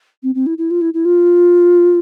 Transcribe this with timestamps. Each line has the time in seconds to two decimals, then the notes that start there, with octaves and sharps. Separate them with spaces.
0.23 C4
0.35 C4
0.46 E4
0.58 E4
0.71 F4
0.81 E4
0.94 E4
1.05 F4